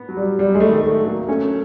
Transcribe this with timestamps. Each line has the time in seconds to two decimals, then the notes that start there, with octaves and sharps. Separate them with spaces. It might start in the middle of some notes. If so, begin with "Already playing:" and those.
Already playing: B3
0.09 F#3
0.17 G3
0.38 F#3 G3
0.55 G#3
0.60 A3
0.69 D#3
0.84 A3
0.98 F#3
1.06 A#3
1.28 A3 C#4